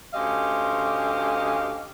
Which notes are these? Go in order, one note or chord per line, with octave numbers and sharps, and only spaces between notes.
D2 C#4 G4 C5 D#5 F5